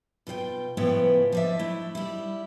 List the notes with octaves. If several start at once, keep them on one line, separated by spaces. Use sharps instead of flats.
B2 F4 C5 G5
A2 C#3 F3 B3 G5
F3 D4 E5
A3 E4
G3 E4